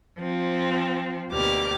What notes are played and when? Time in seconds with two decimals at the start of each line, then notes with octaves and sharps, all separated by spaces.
0.18 F3 C4
1.30 D2 B2 A#3 G4 D6 F6